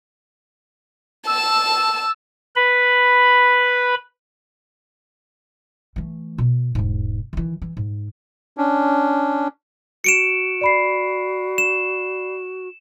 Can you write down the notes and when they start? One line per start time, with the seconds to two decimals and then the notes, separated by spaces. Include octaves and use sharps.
1.27 A5 E6
2.56 B4 B5
5.96 E3 A3
6.38 B2
6.75 E1 G#2
7.33 D#3 E3
7.62 E3
7.77 G#2
8.57 C#4 D4
10.04 F#4 C#7 D7 E7
10.61 D5 B5 C7
11.58 E7